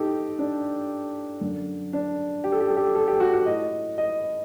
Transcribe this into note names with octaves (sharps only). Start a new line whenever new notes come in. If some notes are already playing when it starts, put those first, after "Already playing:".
Already playing: A2 D#4 G4 A4
D4
F#2 D3
D4
G4
A4
G4
A4
G4
A4
G4
F#4
F#4
A2 D#5
D#5